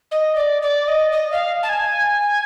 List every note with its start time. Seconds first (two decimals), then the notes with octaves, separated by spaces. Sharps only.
0.11 D#5
0.35 D5
0.62 D5
0.87 D#5
1.12 D#5
1.32 F5
1.63 A5
1.69 G#5